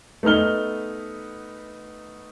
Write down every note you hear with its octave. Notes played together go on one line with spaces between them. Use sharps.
A3 B3 D#4 F6 G7